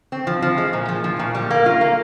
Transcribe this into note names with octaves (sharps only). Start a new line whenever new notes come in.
C4
F3
F3
G#3
A#2
F3
F3
A#2
G3
A#3
F4
A#3